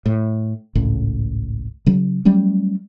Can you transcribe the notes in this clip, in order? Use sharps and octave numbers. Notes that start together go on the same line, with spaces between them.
A2
G#1 C#2 A2
C#3 F#3
F#3 G3 A3 C#4